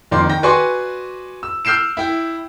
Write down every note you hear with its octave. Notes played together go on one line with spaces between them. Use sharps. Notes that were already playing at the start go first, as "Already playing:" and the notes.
F2 D#3 A#3 D5 G5 C6
D#3 G5 A#6
F#4 B4 D5 G#5 C6 C#6
E6
E6 F6 G6 C7 D7 E7
E4 G5